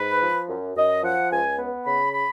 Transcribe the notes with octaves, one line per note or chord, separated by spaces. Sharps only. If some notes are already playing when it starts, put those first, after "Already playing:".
Already playing: G#2 B4
F3
F#2
F#2 D#5
F3 F#5
C#2 G#5
B3
C#3 B5
B5